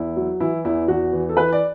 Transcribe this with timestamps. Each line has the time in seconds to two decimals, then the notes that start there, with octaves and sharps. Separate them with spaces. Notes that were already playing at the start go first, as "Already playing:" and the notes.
Already playing: E2 E4
0.16 F#3
0.40 E3 E4
0.65 E2 E4
0.88 E2 F#4
1.13 E3
1.29 A4
1.36 E3 B4
1.52 D5